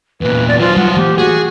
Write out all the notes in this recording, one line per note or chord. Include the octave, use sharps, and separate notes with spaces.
E2 A#2 B4
D5
F#3 F4 C5
G3 F#5
E3 A3 A#3 G4
F#4 G#4